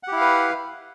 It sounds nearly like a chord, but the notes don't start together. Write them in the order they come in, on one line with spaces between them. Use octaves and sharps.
F#5 G4 E4 F5 B4